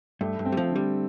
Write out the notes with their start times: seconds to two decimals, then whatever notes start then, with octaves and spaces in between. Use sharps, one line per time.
0.21 G2 A3
0.39 G2
0.45 C4
0.52 G3
0.57 F3
0.69 D3
0.76 G3